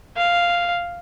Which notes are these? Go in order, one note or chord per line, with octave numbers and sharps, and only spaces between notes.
F5